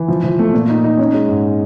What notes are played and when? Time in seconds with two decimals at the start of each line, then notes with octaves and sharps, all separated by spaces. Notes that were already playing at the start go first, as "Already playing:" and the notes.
Already playing: E3
0.08 F3
0.24 F3
0.39 A3
0.53 A#2
0.69 D#4
0.84 D#4
0.99 C#4
1.13 G#3
1.29 G#2